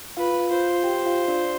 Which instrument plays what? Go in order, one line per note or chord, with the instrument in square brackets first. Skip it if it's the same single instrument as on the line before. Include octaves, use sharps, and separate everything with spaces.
[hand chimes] F4 F5 [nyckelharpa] B4
[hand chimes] F4 F5 [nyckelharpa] C5
[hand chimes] G4 G5
F4 F5
D4 D5